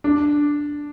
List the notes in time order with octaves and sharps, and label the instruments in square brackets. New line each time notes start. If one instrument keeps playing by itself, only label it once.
[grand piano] D4